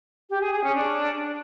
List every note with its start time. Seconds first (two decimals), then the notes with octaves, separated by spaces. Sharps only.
0.30 G4
0.41 G#4
0.53 G#4
0.64 C#4
0.75 D4